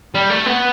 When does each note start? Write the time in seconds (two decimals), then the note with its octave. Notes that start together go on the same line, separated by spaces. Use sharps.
0.14 G3
0.30 A3
0.46 B3